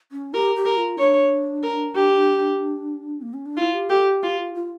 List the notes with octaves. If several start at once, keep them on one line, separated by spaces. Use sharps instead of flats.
C#4
G4 A#4
G4
A#4
F4
D4 C#5
A#4
G4
A#3
C#4
D4
E4 F4
G4
G4 A4
F4 G4
F4
F4